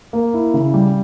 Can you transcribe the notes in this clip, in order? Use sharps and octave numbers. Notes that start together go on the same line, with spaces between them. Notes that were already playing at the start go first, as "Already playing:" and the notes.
A#3
E4
C#3
G3